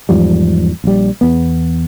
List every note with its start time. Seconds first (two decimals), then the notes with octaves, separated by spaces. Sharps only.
0.09 E2 G#2 F3 G3
0.84 A#1 G3
1.21 E2 B3